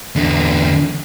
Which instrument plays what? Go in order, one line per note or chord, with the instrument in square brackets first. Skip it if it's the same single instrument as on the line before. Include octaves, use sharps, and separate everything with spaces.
[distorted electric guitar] E2 D3